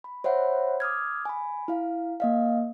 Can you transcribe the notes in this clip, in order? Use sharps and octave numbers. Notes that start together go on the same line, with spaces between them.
B5
C5 C#5 E5 F#5 B5
D6 D#6 F6 G#6
G#5 B5
E4 F5
A#3 D#5 F5